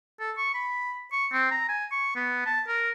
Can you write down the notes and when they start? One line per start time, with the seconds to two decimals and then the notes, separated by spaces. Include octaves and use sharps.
0.20 A4
0.38 C#6
0.54 B5
1.12 C#6
1.32 C4
1.51 A#5
1.69 G#5
1.91 C#6
2.15 B3
2.46 A5
2.68 A#4